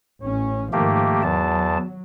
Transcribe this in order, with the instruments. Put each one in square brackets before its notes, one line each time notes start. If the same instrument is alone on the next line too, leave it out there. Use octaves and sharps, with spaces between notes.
[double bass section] A1 C#4
[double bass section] G#2 D#3 F3 [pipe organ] A3 A#3 G4
[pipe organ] E2 A5 [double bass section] F#3